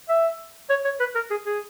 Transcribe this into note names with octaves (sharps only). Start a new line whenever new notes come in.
E5
C#5
C#5
B4
A#4
G#4
G#4